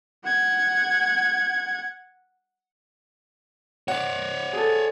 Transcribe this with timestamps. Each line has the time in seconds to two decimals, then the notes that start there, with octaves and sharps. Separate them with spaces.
0.24 F#5 G#6
3.88 C#5 D5 F#5
4.53 G#4 A4